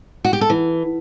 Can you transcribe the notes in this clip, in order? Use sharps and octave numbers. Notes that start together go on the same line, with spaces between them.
F#4
G4
A4
E3